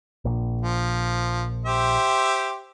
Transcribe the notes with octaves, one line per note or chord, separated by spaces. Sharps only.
A#1
F3
G4 C5 E5